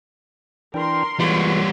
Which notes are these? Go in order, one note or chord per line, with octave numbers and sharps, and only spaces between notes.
E3 D4 A#4 G5 C6
E3 G3 G#3 B3 F4 C#5